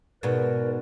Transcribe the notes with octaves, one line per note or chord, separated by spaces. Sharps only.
G#2 B2 B3 A#4 B4 D5